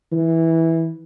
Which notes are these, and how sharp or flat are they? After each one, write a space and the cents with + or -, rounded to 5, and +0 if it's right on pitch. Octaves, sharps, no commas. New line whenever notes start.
E3 -10